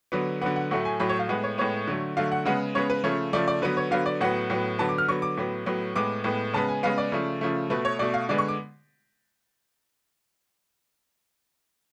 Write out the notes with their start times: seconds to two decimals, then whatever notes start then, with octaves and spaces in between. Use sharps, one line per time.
0.12 D3 F#3 B3
0.41 D3 F#3 B3 F#5
0.56 F#5
0.71 A2 F#3 A3 F#5
0.85 G#5
1.00 A2 F#3 A3 B5
1.09 C#5
1.19 F5
1.29 A2 G#3 B3 F#5
1.44 C#5
1.58 A2 G#3 B3 C#5
1.87 D3 F#3 A3
2.17 D3 F#3 A3 F5
2.32 F#5
2.45 C#3 G#3 B3 F#5
2.75 C#3 G#3 B3 C#5
2.90 B4
3.04 C#3 F3 A3 C#5
3.33 C#3 F3 A3 D5
3.48 D5
3.62 D3 F#3 B3 B4
3.77 C#5
3.91 D3 F#3 B3 F5
4.06 D5
4.21 A2 F#3 B3 F#5
4.50 A2 F#3 B3
4.79 D3 F#3 B3 A5
4.89 D6
4.98 F6
5.08 D3 F#3 B3 C#6
5.22 D6
5.37 A2 F#3 B3
5.66 A2 F#3 B3
5.96 A2 G#3 B3 D6
6.24 A2 G#3 B3
6.53 C#3 G#3 B3 A5
6.68 G#5
6.83 C#3 G#3 B3 F5
6.98 D5
7.12 C#3 F3 A3
7.41 C#3 F3 A3
7.70 B2 A3 B4
7.85 C#5
7.99 B2 A3 D5
8.14 F5
8.29 D3 G#3 B3 D5
8.38 C#6
8.48 D6